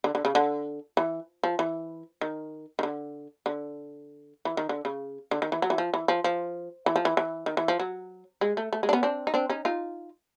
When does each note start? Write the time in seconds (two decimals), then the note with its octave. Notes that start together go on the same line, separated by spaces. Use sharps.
0.04 D3
0.15 D3
0.25 C#3
0.35 D3
0.97 E3
1.44 F3
1.59 E3
2.21 D#3
2.79 D#3
2.83 D3
3.46 D3
4.45 E3
4.57 D#3
4.69 D3
4.85 C#3
5.31 D3
5.42 D#3
5.52 E3
5.62 F#3
5.70 E3
5.78 F3
5.94 E3
6.08 F3
6.24 F3
6.86 E3
6.96 F3
7.05 E3
7.17 E3
7.46 D#3
7.57 E3
7.68 F3
7.80 F#3
8.41 G#3
8.57 A3
8.73 A3
8.83 G#3
8.89 D4
8.93 B3 C#4
9.03 C4 D4
9.27 D#4
9.34 C4 D4
9.50 C#4 D#4
9.65 D#4 F4